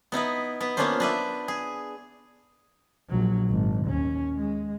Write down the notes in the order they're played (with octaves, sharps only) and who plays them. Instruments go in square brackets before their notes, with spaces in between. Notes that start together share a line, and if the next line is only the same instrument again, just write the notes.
[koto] B3 D#4 E4 B4
B3 B4
A#3 B3 C#4 D4 F4 C5
D4 B4 E5
G#4
[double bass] A#1 F#3
G#1
D#2 C#4
G#3